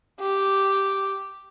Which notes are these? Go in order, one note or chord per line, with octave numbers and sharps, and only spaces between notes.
G4